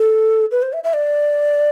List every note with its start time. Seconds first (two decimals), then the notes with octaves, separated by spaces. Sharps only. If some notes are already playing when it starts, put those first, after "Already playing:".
Already playing: A4
0.51 B4
0.62 C5
0.73 E5
0.84 E5
0.94 D5